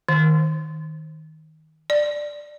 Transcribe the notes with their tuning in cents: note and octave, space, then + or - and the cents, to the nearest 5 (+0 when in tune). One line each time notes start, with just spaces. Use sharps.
D#3 +15
D5 +5